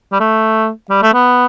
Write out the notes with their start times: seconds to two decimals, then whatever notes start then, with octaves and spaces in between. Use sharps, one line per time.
0.12 G3
0.20 A3
0.90 G3
1.02 A3
1.14 B3